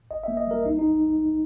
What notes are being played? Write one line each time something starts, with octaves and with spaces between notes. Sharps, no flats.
G1 D#5
A#3 E5
D#5
G3 A#4
B1 D#4
D#4